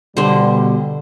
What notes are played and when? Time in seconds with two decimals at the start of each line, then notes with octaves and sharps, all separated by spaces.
0.17 B2 D3 G3 C5